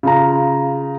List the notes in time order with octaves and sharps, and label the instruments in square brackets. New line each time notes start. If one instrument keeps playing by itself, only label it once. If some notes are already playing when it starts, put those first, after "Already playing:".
[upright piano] C#3 F4 A#5